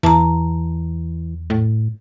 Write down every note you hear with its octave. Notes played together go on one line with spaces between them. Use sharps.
E2 E3 A5 A#5
A2